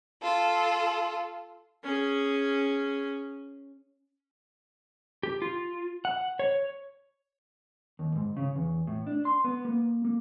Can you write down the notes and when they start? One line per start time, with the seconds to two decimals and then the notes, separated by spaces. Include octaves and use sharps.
0.22 F4 A4
1.84 C#4 G#4
5.23 G4
5.42 F4
6.05 F#5
6.39 C#5
7.99 D#2
8.15 G#2
8.37 C#3
8.56 E2
8.87 A2
9.07 D4
9.25 C6
9.44 B3
9.65 A#3
10.05 A#3